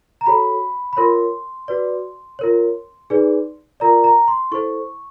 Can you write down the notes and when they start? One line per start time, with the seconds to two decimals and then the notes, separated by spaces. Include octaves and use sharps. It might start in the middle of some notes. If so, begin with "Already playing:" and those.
0.21 A#5
0.26 F#4 A4 C#5 B5
0.93 B5
0.97 F4 A#4 C#5 C6
1.68 F#4 B4 D5
2.39 F4 A#4 C#5
3.10 D#4 G#4 B4 D5
3.80 F4 A#4 D5 A#5
4.04 A#5
4.28 C6
4.51 E4 A4 C5 C#6